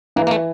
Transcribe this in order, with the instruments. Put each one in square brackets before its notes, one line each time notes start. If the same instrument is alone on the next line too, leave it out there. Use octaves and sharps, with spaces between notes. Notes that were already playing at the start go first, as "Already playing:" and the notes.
[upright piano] E3 [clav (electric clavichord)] A#3
[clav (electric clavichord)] A#3
A3